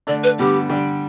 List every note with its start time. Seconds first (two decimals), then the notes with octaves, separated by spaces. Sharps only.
0.07 D3 A3 D4 D5
0.24 B4
0.39 D3 G3 B3 G4
0.69 D3 G3 D4 G4 D5